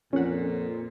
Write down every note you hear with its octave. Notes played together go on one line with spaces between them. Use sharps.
F2 A#2 C#4 F#5